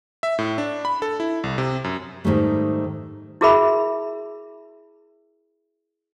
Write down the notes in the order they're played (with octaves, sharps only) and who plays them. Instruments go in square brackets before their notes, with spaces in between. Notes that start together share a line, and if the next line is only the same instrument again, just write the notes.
[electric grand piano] E5
A2
D4
B5
A4
E4
C2
C3
F#2
[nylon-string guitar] G#2 D#3 G3 A3
[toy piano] E4 F#4 G#4 A#4 E5 B5